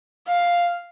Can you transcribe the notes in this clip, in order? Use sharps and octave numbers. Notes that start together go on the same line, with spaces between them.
F5